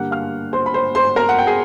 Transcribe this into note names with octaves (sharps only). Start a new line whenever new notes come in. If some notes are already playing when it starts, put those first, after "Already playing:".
Already playing: G2 D3 G3 A#3 F#5 F#6
F5 F6
C5 C6
B5
C5 C6
C5 C6
A#4 A#5
F#5
G5
G#4 G#5